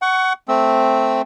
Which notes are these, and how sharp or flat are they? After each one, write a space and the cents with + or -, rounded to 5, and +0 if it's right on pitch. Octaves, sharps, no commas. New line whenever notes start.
F#5 +20 C#6 +10
A3 +0 C4 +0 E6 -15